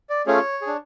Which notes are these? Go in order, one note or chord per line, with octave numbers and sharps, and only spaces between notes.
D5
A3 C#4 F4 G#4 C#5
G#4
D4